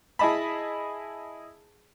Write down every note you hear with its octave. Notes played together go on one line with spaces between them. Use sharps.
E4 G#4 D#5 A5 B5